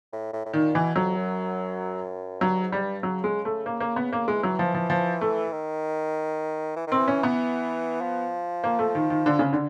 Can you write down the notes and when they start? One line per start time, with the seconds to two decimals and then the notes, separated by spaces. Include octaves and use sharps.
0.13 A2
0.33 A2
0.45 A2
0.53 A#2 D#3
0.75 B2 E3
0.95 F2 F#3
1.16 F#2
2.41 G2 F#3
2.62 G#2
2.72 G3
2.82 G2
3.03 C#3 F#3
3.24 G#3
3.45 A3
3.66 A#3
3.80 A#3
3.96 B3
4.13 A#3
4.28 E3 G#3
4.43 F#3
4.59 F3
4.74 F3
4.90 F3
5.21 A3
5.52 D#3
6.76 E3
6.87 D#3 C4
6.98 E3
7.08 C#4
7.23 B3
8.01 F3
8.64 A#3
8.79 A3
8.95 D#3
9.10 D#3
9.26 D3
9.39 C#3
9.53 D3